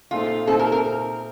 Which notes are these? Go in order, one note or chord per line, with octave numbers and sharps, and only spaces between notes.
A#2 A3 C4 D#4 F4
A#2 A3 C4 D#4 A4
A#4
A#4